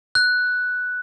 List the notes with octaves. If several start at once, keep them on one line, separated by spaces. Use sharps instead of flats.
F#6